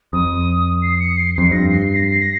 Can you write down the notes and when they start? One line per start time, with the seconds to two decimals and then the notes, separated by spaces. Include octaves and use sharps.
0.13 F2 D#6
0.82 C7
1.00 C#7
1.17 C7
1.35 F2 C7
1.51 G2 A#6
1.69 C7
1.86 C7
1.96 A#6
2.04 C7
2.22 A#6